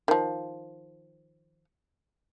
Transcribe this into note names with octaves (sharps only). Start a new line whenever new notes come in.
D#3 F3